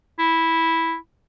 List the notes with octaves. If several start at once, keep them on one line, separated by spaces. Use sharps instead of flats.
E4